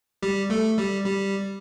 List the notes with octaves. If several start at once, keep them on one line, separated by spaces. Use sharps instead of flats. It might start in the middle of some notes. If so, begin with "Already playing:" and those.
G3 G4
A3 A4
G3 G4
G3 G4